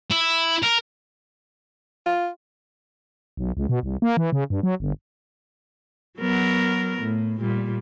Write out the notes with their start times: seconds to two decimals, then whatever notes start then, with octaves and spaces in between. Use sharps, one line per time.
0.11 E4
0.63 A#4
2.06 F4
3.37 B1
3.57 C#2
3.69 B2
3.83 C2
4.02 A#3
4.17 E3
4.32 C#3
4.50 G2
4.63 F#3
4.80 G1
6.18 F#3 B3 A#4
7.01 A2
7.40 A#2 G3